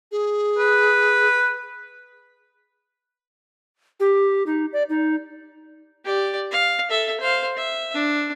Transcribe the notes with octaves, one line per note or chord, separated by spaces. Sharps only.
G#4
B4
G4
D#4
D5
D#4
G4 D5
F5
A4 E5
C5 F5
E5
D4